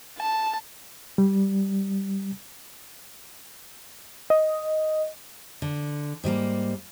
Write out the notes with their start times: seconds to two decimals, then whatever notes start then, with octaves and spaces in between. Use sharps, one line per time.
0.19 A5
1.18 G3
4.30 D#5
5.62 D3
6.24 G#2 G3 A3 A#3